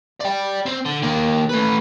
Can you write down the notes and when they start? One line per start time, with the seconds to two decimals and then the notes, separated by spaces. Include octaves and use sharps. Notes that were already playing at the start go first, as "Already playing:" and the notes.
0.20 D5 G5
0.66 C4
0.86 D3
1.03 D#3 A#3
1.49 A3 B4